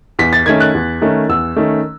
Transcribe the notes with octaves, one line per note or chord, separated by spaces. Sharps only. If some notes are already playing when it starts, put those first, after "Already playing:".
E2 B6
A6
D#3 A3 C#4 G#6
F#6
E2
D#3 A3 C#4
E2 E6
D#3 A3 C#4